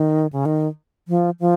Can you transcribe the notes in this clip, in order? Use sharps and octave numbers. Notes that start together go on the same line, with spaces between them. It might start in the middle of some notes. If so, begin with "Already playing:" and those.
Already playing: D#3
C#3
D#3
F3
F3